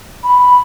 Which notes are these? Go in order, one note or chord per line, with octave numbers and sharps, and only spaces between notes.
B5